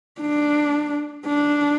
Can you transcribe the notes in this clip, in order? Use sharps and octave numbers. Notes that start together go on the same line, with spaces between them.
D4
D4